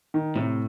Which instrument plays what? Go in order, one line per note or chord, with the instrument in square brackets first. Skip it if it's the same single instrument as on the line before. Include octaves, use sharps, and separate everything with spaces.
[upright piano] D#3
[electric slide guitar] A2 [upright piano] C3